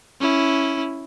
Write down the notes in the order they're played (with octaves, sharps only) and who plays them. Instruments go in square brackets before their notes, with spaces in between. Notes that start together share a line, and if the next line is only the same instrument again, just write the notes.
[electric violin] C#4 E4